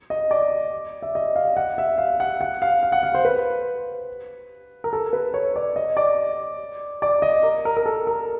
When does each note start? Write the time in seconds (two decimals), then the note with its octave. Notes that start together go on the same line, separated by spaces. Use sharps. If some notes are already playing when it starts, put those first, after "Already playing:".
0.10 D#5
0.31 D5
1.02 E5
1.15 D#5
1.36 F5
1.57 F#5
1.78 E5
1.98 F5
2.20 F#5
2.41 F#5
2.62 F5
2.83 F5
2.92 F#5
3.03 F5
3.15 C5
3.25 B4
4.84 A#4
4.93 A4
5.13 B4
5.34 C#5
5.56 D5
5.76 D#5
5.97 D5
7.02 D5
7.22 D#5
7.43 A#4
7.65 A#4
7.77 A#4
7.86 A4
8.07 A#4